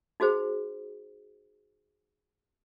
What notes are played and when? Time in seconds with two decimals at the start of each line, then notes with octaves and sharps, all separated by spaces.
0.20 D#4 F#4 G#4 C5